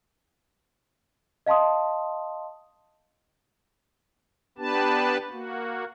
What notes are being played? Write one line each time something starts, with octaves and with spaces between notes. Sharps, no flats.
D#5 F5 A5 C6 D#6
B3 D4 G4 B4 A5
A#3 F#4